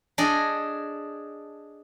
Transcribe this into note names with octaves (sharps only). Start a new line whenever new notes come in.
D4 G#4 A4 D#5